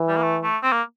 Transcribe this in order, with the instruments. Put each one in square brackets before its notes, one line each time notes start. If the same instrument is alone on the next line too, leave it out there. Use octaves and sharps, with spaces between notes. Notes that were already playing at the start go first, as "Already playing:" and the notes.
Already playing: [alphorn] E3
[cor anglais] G3
A#3
A3
A3
C4
A#3